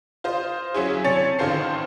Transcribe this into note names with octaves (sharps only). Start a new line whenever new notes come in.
F4 C5 D#5
F#3 C#4 E4 G#4
C3 C#5 G#5 A5 A6 C#7
A1 D#3 F4 A4 C5 C7